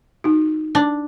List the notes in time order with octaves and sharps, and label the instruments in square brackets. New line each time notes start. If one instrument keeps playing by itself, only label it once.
[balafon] D#4 F#4
[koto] D4